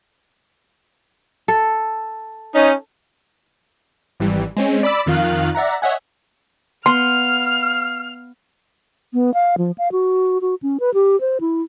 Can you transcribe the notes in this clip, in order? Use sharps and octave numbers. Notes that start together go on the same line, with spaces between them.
A4
C#4 D#4
G#1 E3 G3
G#3 C4 C#4
D5 B5 D6 E6
F2 D#3 F4 F5 F#6
D5 E5 F#5 A#5
C#5 D#5 E5 F#5 G#5
B3 F5 C6 F6
B3
F5
F3
F5
F#4
F#4
C#4
B4
G4
C5
E4